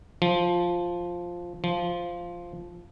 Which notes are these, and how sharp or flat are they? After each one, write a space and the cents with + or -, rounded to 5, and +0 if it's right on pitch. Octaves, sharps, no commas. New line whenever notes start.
F3 +0
F3 -5